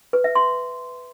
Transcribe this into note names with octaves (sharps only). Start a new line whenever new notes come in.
B4
E5
C6